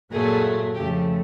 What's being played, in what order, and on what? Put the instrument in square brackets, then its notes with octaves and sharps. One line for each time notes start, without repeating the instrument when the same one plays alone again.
[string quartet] A#2 F#3 A3 G#4
F2 C#3 F3 A3 G4